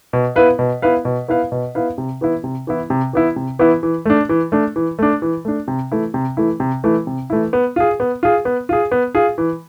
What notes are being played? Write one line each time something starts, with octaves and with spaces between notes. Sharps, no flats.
B2
B3 E4 B4 F5
B2
B3 E4 B4 F5
B2
B3 E4 B4 F5
B2
B3 E4 B4 F5
C3
E3 B3 E4
C3
E3 B3 E4
C3
E3 B3 E4
C3
E3 B3 E4
E3
A3 D4
E3
A3 D4
E3
A3 D4
E3
A3 D4
C3
E3 A3 E4
C3
E3 A3 E4
C3
E3 A3 E4
C3
E3 A3 E4
B3
F4 G#4
B3
F4 G#4
B3
F4 G#4
B3
F4 G#4
E3